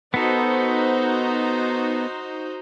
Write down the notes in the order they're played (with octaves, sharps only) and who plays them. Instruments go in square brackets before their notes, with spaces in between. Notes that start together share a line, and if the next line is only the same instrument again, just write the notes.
[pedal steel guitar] B3 A4 [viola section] D#4 F#4 C5